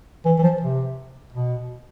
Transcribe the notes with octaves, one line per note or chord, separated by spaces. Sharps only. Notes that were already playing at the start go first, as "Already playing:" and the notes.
E3
E3
F3
C3
B2